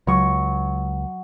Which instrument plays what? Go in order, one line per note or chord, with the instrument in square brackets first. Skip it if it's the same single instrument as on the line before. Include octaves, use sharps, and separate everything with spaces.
[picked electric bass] C#2 [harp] F#3 C#6